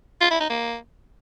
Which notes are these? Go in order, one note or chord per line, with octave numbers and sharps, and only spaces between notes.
F4
E4
D#4
A#3